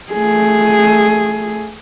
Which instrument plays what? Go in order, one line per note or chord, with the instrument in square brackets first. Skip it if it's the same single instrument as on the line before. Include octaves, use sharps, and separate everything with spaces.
[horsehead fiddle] A3 G#4